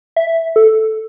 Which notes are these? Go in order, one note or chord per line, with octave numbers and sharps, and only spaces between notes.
E5
A4